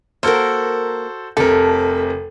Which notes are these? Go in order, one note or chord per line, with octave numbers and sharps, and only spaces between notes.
A#3 F#4 A4 A#4 C5
F1 C3 A4 A#4